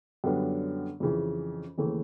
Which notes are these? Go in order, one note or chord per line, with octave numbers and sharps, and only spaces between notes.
F#2 D3 G3 B3 D4
F2 C#3 E3
D#2 C#3 E3 A3